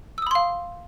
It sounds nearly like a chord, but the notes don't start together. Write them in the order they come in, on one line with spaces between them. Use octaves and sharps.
E6 D#6 B5 C6 F5